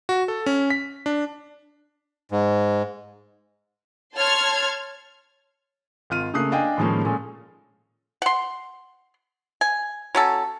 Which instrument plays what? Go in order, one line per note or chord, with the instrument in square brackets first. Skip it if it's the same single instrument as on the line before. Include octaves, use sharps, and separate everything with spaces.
[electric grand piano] F#4
A4
C#4
B6
D4
[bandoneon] G#2
[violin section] C#5 A5 C6 F6 G#6
[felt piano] G#1 F4 F6 D#7
C#3 A3 A#3 D#6 F#6 C7
D4 D#5 F5 G5 G#5
A2 D#3 F3 G#3 A#3 C#4
A#2 G#3 C#4 A4
[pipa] F#5 C6
G#5
F#3 C#4 A4